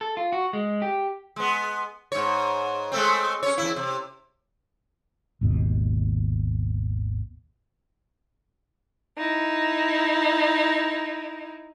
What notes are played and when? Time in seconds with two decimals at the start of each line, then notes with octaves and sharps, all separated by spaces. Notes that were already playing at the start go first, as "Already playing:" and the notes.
0.01 A4
0.17 F4
0.32 F#4
0.53 G#3
0.82 G4
1.36 G#3 B3
2.12 G#2 C#5
2.92 G#3 A3 C4
3.43 C#4 C#5
3.58 E2 B2 E4
3.76 C3
5.41 G#1 D#2 B2
9.16 D#4 E4